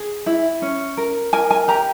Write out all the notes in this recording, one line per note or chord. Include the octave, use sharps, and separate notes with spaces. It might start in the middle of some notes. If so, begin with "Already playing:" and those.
Already playing: G#4
E4
C#4
A#4
A#4 G#5
G#5
G4 A#5